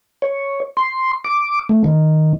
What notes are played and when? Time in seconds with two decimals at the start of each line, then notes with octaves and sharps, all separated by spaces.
0.22 C#5
0.77 C6
1.24 D6
1.69 A3
1.84 D#3